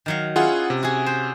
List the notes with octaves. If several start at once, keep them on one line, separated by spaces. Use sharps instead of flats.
D#3 F#3 F5
C#4 E4 F4 G#4 F#5
C3
F#4 G#4
C5